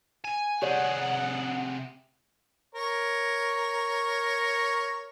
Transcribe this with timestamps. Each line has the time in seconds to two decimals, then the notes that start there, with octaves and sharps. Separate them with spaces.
0.24 G#5
0.62 C3 G4 G#4 C#5 D5 F#5
2.75 A#4 C#5